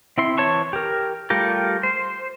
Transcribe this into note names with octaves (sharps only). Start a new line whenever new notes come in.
C4 E4 C6
E3 C#5 A5 C#6
G4 A#4
G3 A3 F4 G4 A#4
C5